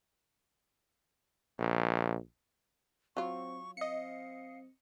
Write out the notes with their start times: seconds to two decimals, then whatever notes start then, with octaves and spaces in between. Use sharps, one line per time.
1.59 A#1
3.17 F#3 C4 F4 C#6
3.77 C4 D#5 F5 C#7